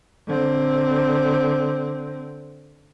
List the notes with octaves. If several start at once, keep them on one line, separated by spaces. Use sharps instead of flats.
D3 C4